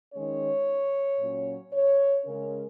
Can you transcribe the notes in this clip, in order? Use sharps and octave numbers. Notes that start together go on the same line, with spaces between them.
D#3 G#3 C#4 C#5
A#2 F#3 C#4
C#5
C#3 G#3 C#4 A#4